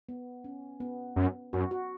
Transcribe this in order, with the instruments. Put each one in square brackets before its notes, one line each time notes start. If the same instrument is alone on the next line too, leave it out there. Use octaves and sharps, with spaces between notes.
[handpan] B3
C#4
B3
[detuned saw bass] F#2
[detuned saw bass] F#2 [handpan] F#4
[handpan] F#4